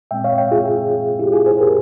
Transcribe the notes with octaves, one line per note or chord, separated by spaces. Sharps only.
A#2 G#3 C4 E5 G5
C#5 F5
E5 G5
F4 G#4
E4 G4
F4 G#4
G#4 C5
G4 A#4